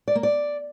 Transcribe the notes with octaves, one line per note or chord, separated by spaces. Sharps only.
D5
A#3
D5